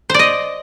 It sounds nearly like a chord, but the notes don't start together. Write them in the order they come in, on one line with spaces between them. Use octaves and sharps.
C5 D5 D#5